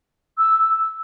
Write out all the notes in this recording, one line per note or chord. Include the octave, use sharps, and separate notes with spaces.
E6